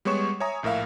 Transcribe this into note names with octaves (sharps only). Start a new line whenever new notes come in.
G3 G#3 B3 C#5 C#6 E7
C#5 E5 G#5 A#5 D#6
A#1 A2 A#4 E5 F5